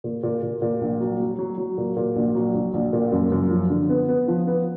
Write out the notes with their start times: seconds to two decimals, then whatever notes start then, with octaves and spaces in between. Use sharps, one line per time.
0.04 A#2
0.23 A#2
0.42 A#2
0.62 A#2
0.81 A#1
1.00 F#3
1.20 F#3
1.39 F#3
1.58 F#3
1.78 A#2
1.97 A#2
2.16 A#1
2.35 F#3
2.54 A#1
2.74 A#1
2.93 A#2
3.12 F#2
3.32 F#2
3.51 F3
3.70 D3
3.89 B3
4.08 B3
4.28 F3
4.47 B3